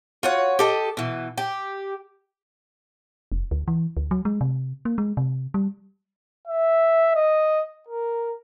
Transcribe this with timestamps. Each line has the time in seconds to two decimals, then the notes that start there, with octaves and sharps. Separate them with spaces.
0.23 F4 F#4 C#5
0.59 G4 A4 D#5
0.97 B2 E3
1.38 G4
3.32 F1
3.51 D2
3.68 E3
3.97 D2
4.11 F#3
4.25 G#3
4.41 C3
4.85 A#3
4.98 G#3
5.17 C3
5.54 G3
6.47 E5
7.15 D#5
7.89 A#4